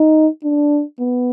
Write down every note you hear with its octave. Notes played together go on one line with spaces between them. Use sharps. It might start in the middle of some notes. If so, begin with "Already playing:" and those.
Already playing: D#4
D4
B3